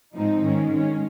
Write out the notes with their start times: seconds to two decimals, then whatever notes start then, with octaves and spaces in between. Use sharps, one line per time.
0.15 G#2 F3 G#3 C4 D#4
0.43 G#2 D#3 G#3 C#4
0.71 D#3 G#3 C#4